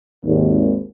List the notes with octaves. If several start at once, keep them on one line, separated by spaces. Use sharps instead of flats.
G#1 D#2